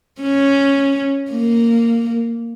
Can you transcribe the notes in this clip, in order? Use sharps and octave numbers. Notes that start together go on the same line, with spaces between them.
C#4
A#3